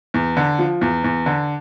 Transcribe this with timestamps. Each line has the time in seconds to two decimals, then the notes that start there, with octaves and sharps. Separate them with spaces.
0.14 E2
0.37 D3
0.59 F3
0.81 E2
1.04 E2
1.26 D3